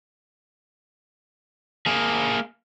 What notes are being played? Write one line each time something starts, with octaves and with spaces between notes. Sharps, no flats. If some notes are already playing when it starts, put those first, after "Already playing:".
A#3 G#4